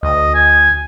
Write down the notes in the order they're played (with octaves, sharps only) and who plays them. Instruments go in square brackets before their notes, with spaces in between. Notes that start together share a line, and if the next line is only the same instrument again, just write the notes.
[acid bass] D2 [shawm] D#5
[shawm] G#5